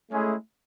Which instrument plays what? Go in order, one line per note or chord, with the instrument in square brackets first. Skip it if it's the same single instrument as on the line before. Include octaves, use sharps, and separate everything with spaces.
[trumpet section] G#3 C#4 E4 G#4 [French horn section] A3